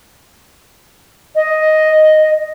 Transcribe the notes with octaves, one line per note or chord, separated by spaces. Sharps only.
D#5